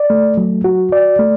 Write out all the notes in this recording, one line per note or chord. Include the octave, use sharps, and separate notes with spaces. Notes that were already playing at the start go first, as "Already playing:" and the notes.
Already playing: D5
A3
F#3
F#4
D5
A3